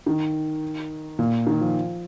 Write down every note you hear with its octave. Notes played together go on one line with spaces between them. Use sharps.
D#3
A#2
D#3
F3